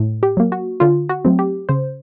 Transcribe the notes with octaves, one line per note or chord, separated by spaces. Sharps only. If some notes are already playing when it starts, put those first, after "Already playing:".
Already playing: A2
G4
F#3 A#3
F#4
D3 F4
F#4
F#3 A3 C4
G4
C#3 C5